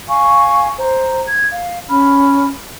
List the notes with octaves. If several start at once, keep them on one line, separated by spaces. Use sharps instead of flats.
F5 G#5 C#6
C5 A#5
G#6
F5
C#4 B5 F6